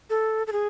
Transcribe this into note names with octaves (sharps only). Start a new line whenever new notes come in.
A4
A4
G#4